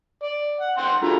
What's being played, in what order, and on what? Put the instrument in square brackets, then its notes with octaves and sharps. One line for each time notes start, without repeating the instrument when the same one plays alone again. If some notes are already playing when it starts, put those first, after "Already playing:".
[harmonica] D5
F#5
F#5 G5 C6
[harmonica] G#3 A3 A#5 [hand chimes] D4 F4 F#4